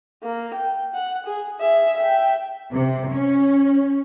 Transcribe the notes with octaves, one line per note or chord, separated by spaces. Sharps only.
A#3
G5
F#5
G#4
G#4 E5
E5 G5
C3
C#4